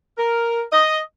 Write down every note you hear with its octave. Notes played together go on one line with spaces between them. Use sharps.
A#4
D#5